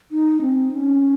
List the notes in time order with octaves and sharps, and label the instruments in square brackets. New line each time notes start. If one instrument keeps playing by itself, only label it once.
[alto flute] D#4
C4
C#4